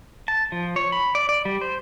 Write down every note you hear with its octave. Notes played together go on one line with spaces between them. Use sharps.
A5
F3
C#5
B5
D5
D5
G3
C5